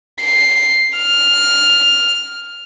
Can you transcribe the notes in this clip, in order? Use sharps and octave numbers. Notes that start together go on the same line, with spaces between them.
C7
F6